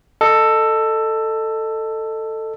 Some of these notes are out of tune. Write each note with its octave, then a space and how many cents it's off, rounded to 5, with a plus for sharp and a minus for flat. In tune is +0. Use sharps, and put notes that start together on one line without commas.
A4 +10 D#5 -15